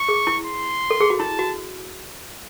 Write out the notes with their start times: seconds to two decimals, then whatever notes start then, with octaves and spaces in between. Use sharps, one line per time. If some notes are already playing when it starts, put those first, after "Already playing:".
Already playing: C#6
0.09 G#4
0.27 E4
0.46 C6
0.90 A4
1.01 G#4
1.10 F#4
1.20 E4 A5
1.39 F#4